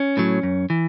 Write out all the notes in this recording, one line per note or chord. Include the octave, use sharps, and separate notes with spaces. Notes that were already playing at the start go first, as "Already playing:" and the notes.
Already playing: C#4
A2 F#3
F#2
E3